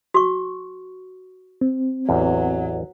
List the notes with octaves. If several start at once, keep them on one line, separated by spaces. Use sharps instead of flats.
F#4 C#6
C4
A1 E2 F#3